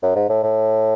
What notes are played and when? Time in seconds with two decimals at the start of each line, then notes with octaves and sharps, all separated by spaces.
0.02 F#2
0.15 G#2
0.29 A2
0.43 A2